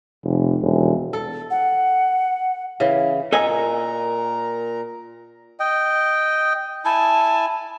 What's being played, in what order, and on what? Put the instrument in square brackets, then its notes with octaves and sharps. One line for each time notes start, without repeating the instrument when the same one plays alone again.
[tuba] F1
E1
[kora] A4
[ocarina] F#5
[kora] C#3 E3
[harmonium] A#2 A#4 A#5 [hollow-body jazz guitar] A4 D#5 G#5
[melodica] D#5 G5
[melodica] E4 G#5 [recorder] A5